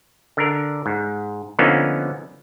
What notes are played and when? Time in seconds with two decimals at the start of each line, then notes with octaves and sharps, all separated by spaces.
0.37 D3 D4 A#4
0.86 G#2
1.59 D3 F3 A#3 B3 C#4 D#4